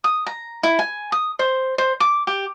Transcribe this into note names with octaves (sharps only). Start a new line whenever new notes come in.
D#6
A#5
E4
G#5
D#6
C5
C5
D6
G4